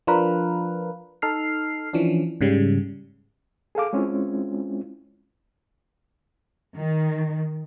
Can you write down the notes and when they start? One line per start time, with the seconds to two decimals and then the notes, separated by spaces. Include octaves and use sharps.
0.07 F3 D4 F4 A#4 B4
1.22 D#4 A4 F6 C7
1.93 E3 F3 C#4 D4
2.41 G#2 C#3 G3
3.75 G#4 A4 F5 D6
3.93 G#3 C4 C#4 E4 F4
6.77 D#3